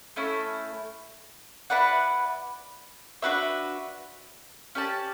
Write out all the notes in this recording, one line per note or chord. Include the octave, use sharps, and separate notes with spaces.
A3 C#4 E4
E4 B4 D5 F#5
D4 F#4 B4 E5
C#4 G4 D5 A5